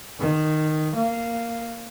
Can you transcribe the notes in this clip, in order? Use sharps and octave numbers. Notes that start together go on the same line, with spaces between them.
D#3
A#3